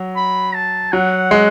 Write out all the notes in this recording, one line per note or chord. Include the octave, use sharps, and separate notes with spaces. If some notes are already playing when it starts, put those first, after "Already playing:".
Already playing: F#3
B5
A5
F#3 F#5
G#3